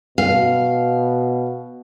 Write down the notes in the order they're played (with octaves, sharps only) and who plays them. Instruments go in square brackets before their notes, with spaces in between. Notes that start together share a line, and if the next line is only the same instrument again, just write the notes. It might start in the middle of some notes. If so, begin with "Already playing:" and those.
[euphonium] B2 [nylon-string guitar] F5